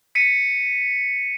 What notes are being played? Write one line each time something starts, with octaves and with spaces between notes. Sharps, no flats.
B6 C#7 D#7